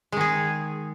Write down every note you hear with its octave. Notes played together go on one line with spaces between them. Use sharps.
D#3 G#3 G#4